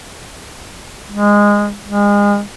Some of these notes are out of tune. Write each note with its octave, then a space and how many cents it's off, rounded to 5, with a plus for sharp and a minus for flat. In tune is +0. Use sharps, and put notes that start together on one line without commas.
G#3 -15
G#3 -30